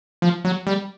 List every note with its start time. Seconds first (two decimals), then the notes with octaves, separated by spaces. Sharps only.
0.22 F3
0.45 F#3
0.67 G3